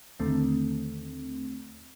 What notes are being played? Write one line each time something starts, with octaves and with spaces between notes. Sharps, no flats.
D#2 D3 D#3 A3 C4